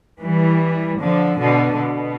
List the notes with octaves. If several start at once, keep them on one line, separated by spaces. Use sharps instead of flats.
E3 G3
D3 F3
B2 D3
B2